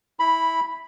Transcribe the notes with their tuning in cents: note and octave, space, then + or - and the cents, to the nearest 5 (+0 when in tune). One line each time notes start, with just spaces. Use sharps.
E4 -15 B5 +0